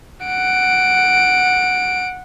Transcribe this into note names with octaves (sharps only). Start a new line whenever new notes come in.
F#5 D7